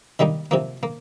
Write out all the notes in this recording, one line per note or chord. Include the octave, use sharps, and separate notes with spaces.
D#3 G3 A#3 D#4
C3 F3 A#3
A#3